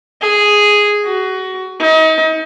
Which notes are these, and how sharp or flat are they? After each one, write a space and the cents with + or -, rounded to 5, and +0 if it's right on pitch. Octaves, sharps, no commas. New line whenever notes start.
G#4 +0
F#4 +20
D#4 +35